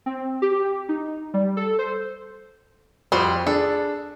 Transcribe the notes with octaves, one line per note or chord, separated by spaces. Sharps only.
C4
G4
D#4
G3
A4
C5
F2 G3 F#4 C5
D4 G#4 A4